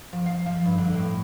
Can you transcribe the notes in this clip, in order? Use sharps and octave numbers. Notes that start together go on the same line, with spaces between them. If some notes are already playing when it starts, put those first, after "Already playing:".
F3
F5
F3
G2
D3
A2